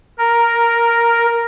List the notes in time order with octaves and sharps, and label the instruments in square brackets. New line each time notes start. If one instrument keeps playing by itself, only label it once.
[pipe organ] A#4